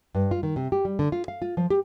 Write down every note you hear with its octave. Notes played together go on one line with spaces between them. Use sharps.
G2
F4
D#3
C3
G4
G3
D3
F4
F5
F4
F3
G4